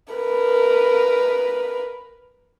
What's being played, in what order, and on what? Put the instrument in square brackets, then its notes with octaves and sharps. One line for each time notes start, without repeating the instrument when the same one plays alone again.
[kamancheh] A#4 B4